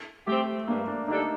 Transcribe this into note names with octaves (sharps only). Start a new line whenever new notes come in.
A3 C4 G4
G2 A#3
D4
D3 G3 D4 D#4 A4